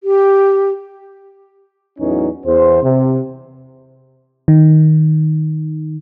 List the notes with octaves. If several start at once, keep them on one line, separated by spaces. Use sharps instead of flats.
G4
E2 A2 E3 F#3 C#4 D#4
E2 C5
C3
D#3